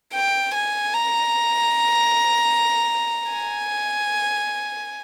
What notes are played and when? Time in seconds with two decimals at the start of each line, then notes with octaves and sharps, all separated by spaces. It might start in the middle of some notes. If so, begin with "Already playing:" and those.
0.15 G5
0.54 G#5
0.94 A#5
3.32 G#5